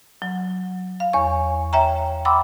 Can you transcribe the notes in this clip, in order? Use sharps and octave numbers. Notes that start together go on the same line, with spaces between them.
F#3
F5
E2 C#5 C#6
C#5 E5 G5 A#5
F#5 G5 B5 C6 D6 E6